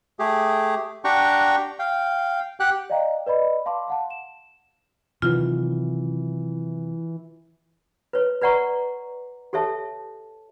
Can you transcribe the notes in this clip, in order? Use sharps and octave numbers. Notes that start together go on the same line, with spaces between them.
A3 G4 G#4
D4 G4 F#5 G5 A#5 C#6
F5 G5
G4 F#5 G5 F#6
D5 D#5 F5 G5 A#5
B4 D5 D#5 B5
F5 A5 C6 D6
F5 F#5 A5
E7
C3 D#3 E3 F#3 F4
B4 C#5
B4 D5 F#5 A#5 C#6
G4 A4 C#5 E5 A5